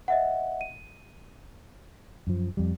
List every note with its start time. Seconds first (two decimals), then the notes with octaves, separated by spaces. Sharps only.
0.08 D#5 E5 F#5
0.61 D#7
2.27 F#2 F3
2.57 F2 G3